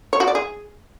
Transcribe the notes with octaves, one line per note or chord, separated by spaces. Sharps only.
C#5
F#4
D5
G#4